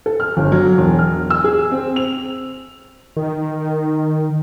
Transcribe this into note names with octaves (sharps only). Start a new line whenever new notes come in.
A4
F6
G1
F#3
E1
F6
E6
G#4
C4
F7
D#3